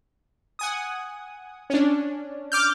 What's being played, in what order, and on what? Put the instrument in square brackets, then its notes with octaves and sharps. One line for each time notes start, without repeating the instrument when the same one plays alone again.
[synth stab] F#5 G#5 D#6
C#4 D4
[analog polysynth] D6 F6 G6